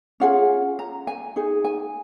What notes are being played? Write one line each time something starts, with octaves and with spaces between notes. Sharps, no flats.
C#4 F4 G#4 F#5
A#5
G#5
D#4 G#4
G#5